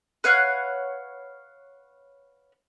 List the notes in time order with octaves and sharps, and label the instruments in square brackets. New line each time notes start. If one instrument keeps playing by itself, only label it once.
[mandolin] B4 C#5 F5 F#5